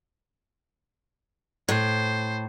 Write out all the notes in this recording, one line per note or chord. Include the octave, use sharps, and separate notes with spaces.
A2 C5